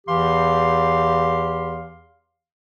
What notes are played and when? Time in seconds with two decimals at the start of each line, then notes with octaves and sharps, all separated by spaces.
0.07 E2 E3 G4 F5 C6